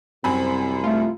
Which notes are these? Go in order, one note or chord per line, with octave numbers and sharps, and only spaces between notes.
C2 F#2 C4 G#5 B5
A3 F4